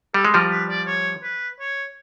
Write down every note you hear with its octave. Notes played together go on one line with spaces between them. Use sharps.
G3 A4
G#3
F3 G3 A#4
B4
D5
C#5
B4
C#5